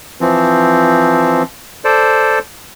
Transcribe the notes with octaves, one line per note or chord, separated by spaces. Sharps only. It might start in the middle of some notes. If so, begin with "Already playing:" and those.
E3 F3 C4
A4 C5 D5